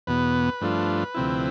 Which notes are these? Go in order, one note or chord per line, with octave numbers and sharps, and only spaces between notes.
E2 B2 B3 B4
G2 F3 A3 D4 F4
D2 C3 F3 C4 E4